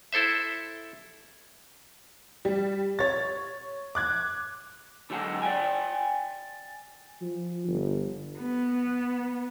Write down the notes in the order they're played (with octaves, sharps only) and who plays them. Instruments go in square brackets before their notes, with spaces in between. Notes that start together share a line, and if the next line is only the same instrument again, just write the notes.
[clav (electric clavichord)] E4 A4 C5 E5
[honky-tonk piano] G3
C#5 A6
D6 F#6 G#6
[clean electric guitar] D3 F#3 G#3 C4 F#4 A4
D5 E5 G5 G#5
[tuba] F3
G1
[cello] B3